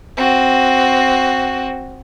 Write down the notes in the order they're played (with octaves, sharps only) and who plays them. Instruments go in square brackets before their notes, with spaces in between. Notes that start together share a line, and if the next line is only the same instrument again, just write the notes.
[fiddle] C4 F#4